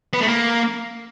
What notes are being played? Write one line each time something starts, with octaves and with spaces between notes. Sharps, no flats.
B3
A3
A#3